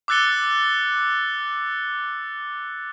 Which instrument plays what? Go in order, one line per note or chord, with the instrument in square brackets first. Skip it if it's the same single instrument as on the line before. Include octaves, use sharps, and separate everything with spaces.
[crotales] D6 E6 F#6 A6 C#7 G7